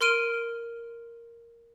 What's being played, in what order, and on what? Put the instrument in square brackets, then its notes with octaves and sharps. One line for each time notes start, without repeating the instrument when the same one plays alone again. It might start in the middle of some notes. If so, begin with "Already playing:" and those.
[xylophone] A#4 C6 F6 D7 D#7